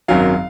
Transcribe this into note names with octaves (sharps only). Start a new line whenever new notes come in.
G#1 F#2 D#3 F#3 F5